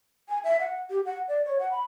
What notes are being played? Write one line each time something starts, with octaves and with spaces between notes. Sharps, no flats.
G#5
E5
F#5
G4
F#5
D5
C#5
F#5
B5